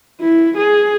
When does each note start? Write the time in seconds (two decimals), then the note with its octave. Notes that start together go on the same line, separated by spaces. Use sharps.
0.21 E4
0.57 G#4